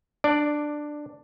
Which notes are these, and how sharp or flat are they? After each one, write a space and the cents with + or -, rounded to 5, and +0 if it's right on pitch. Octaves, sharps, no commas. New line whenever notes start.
D4 +10 D5 +0